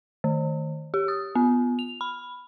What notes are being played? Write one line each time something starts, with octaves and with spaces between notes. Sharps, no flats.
D#3
G4
D#6
B3
F7
B5